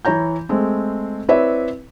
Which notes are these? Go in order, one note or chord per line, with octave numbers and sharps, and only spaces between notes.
E3 E4 C#5 A#5 G6
G#3 A3 C4
C4 E4 B4 C#5 D5 E5